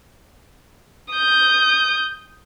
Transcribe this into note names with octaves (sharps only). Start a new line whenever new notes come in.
D#6 G6